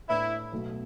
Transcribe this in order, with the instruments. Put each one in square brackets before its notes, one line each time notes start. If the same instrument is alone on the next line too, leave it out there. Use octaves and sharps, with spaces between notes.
[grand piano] A2 A3 D4 B4 [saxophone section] E4
[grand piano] B1 B2 A3